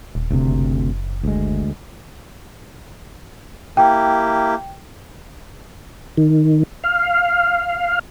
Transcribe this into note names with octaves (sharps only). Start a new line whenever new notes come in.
D#1
D2 C3
F#1
D2 G#3
A#3 E4 G4 G5
D#3
F5